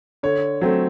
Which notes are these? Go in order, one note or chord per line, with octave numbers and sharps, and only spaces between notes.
D3 C#5
F#3 A3 C4